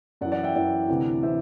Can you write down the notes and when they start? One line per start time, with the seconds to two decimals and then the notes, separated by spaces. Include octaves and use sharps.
0.21 F#2 D5 F#5
0.25 E3
0.32 D5 F#5
0.43 E5 G5
0.54 F#2 E3 D5 F#5
0.88 D2 C3 E3
1.23 C3 E3 C5 E5